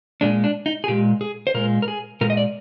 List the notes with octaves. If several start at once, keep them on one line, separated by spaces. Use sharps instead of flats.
A#2 G#3 D4
D4
D#4
G#4
A#2 G#3 G4
G#4
C5
A#2 G#3 A#4
A#4
G#4
A#2 G#3 A#4
D#5
D5